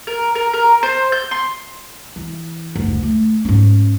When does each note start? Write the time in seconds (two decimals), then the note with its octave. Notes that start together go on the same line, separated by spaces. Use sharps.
0.07 A#4
0.35 A#4
0.53 A#4
0.83 C5
1.12 G6
1.31 C6
2.16 E3
2.76 F#1 D2
3.03 A3
3.45 G#2 C#4